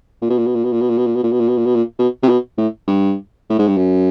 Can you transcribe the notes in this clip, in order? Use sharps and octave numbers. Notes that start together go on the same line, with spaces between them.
A#2
B2
A#2
B2
A#2
B2
A#2
B2
A#2
B2
A#2
B2
A#2
B2
A#2
B2
A#2
B2
A#2
B2
C3
B2
A2
G2
A2
G#2
G2
F#2